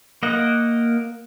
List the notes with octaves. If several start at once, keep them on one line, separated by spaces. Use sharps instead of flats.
A#3 D#5 F#5